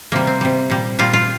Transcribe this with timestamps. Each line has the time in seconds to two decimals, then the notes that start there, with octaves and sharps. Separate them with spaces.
0.12 C3 G3 A#3
0.27 C4
0.41 C3 G3
0.70 A#2 G3
0.99 A#2 G3 F4
1.13 F4